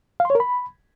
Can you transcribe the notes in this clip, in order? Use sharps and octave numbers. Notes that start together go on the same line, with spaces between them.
F5
C6
C#5
A#4
B5